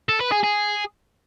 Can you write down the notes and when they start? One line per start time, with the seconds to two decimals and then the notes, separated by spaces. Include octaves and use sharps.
0.09 A4
0.20 B4
0.32 G#4
0.43 G#4